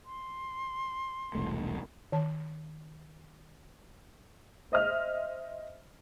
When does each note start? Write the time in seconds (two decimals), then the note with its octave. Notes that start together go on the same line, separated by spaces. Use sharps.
0.05 C6
1.35 E1 C2 A3
2.12 D#3 A5
4.72 C5 D#5 E5 F6